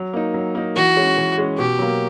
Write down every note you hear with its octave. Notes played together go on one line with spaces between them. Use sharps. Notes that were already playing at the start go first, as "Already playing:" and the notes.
Already playing: F#3
A#3 D#4
F#3
A#3 D#4
E3 F#4
G#3 C#4
E3
G#3 C#4
B2 G4
F#3 A#3